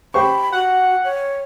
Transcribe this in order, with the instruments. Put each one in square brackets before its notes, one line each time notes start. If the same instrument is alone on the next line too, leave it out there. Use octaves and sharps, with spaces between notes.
[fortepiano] G4 C5 C#6 [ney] B5
[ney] F#4 [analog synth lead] F#5
[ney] C#5